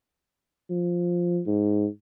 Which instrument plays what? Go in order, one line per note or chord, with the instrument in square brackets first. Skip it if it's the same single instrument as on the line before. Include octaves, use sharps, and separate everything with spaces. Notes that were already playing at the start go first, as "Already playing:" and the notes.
[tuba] F3
G#2